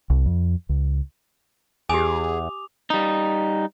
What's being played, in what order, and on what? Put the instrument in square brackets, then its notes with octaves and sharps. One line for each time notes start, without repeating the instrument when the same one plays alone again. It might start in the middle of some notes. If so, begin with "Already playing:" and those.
[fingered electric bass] C2
F2
C#2
[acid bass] E2 [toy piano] G4 G#5 [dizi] G#4 [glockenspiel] D6 D#6 F7
[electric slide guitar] G3 D#4